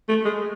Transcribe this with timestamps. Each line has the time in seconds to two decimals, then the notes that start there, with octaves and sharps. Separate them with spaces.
0.09 A3
0.25 G#3